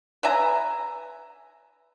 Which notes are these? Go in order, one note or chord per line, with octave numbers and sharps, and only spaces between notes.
B4 E5 G#5 A#5